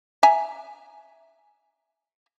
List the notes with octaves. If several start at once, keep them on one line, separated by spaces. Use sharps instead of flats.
E5 G#5 A#5